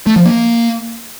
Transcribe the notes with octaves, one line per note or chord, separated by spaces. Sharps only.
A3
F3
A#3